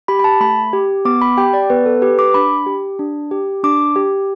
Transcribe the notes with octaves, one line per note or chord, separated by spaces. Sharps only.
G4 B5
B5
A5
A3 B5
G4
B3 D6
B5
G4 G5
D5
B3 B4
A4
G4 B4
D6
D4 B5
G4
D4
G4
D4 D6
G4